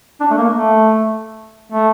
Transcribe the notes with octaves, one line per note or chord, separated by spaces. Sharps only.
D4
A3
A#3
A3
A3